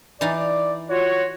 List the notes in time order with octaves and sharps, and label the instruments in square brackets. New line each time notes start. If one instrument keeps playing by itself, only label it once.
[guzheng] E3 D#4 F5 [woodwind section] D5
[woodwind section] F4 F#4 [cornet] C#5